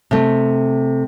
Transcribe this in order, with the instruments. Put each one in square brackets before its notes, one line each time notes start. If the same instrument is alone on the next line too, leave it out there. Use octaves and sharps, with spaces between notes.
[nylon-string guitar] C3 A3